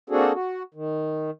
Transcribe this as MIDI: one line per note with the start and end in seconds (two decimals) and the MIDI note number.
0.10 0.32 58
0.10 0.32 60
0.10 0.32 62
0.10 0.32 66
0.10 0.32 68
0.10 0.32 69
0.34 0.63 66
0.74 1.30 51